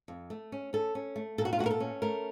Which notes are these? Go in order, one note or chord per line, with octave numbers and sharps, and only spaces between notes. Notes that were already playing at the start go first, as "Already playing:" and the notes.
F2
A3
C#4
C#4 A4
C#4
A3
A#2 A4
F#4
F4
A3 F#4
A#4
A4
C#4
A3 A#4